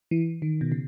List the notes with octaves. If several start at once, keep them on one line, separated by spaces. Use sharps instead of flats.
E3
D#3
B2
C#3